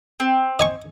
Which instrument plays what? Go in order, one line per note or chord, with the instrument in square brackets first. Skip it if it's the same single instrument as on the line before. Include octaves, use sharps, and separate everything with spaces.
[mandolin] C4
[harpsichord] D#5 G#5 C#6